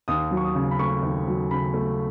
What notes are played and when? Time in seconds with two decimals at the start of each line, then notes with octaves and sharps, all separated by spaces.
0.08 D#2 D#6
0.31 F#3
0.37 C#6
0.44 D#6
0.55 C#3
0.71 B5
0.79 A3 C#6
1.03 D#2
1.27 F#3
1.51 C#3 B5
1.74 A3